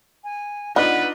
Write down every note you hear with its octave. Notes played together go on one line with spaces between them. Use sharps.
G#5
B3 D4 D#4 F4 B4 F#5